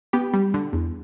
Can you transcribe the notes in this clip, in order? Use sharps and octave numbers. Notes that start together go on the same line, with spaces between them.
B3 G4
G3
D3
E2